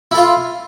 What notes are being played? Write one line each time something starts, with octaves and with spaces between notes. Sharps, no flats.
E4 F4 A4